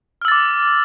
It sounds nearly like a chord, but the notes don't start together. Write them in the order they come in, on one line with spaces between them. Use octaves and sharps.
F6 E6 A6 D6